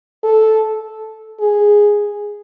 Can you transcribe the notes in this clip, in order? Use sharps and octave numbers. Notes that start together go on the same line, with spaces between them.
A4
G#4